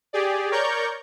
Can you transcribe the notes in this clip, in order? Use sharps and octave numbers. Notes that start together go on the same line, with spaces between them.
G4 G#4 D5
A#4 C#5 D5 A#5 C#6 G6